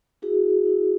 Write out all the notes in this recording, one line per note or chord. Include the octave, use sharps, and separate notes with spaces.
E4 F#4 G#4
E4